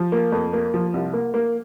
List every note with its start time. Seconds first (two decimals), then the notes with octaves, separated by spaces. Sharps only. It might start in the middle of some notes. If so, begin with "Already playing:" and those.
Already playing: F3
0.12 A#3
0.32 F2
0.53 A#3
0.74 F3
0.94 C2
1.13 A#3
1.34 A#3